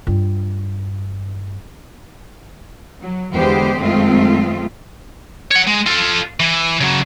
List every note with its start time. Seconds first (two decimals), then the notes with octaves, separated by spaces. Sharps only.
0.07 G2 F4
3.02 F#3
3.36 E2 D3 G#3 B3 G4 C5
3.80 F#2 D#3 G#3 A3 C4 F4
5.52 C#5 F#5
5.67 G#3
5.87 F4 A4
6.40 E3
6.81 C#3 F#3